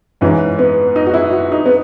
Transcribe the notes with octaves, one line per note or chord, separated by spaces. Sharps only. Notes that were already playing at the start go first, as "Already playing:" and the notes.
G#2 E3 C#4
B3
D#4
F#4
E4
F#4
D#4
B3